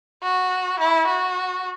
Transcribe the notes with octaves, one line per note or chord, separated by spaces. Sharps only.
F#4
E4
F#4